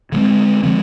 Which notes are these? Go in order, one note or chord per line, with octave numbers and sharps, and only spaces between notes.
D3 F3 G#3 C4
D3 F3 G#3 C4